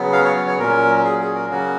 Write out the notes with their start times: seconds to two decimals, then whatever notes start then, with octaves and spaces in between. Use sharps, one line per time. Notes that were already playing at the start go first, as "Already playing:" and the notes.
Already playing: C#3 F#3 B3
0.13 F5
0.25 C#5
0.36 C#5
0.47 C#5
0.59 A#2 F#3 C#4 A#4
1.04 G#4
1.20 G#4
1.35 A#4
1.50 C#3 F#3 A#3 C#4 F#4